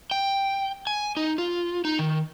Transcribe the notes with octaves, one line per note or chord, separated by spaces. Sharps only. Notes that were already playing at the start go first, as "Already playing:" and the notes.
G5
G#5
D#4
F4
D#4
D#3